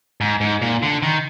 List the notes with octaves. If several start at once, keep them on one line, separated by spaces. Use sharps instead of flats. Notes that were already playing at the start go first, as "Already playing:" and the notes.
G#2
G#2
A#2
D3
D#3